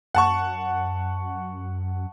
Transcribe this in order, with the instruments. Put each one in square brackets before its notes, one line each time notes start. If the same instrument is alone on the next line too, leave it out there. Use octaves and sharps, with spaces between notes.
[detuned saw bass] F#2 [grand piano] F#5 A5 C#6